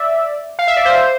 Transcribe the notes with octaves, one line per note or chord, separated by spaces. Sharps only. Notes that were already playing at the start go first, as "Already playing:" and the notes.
Already playing: D5 E5
F5
E5
D5
C5